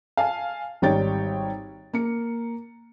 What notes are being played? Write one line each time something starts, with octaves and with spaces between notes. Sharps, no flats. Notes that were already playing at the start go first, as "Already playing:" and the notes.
F5 G#5 A5
G#1 G3 D#4 C#5 G5 A6
A#3 C#7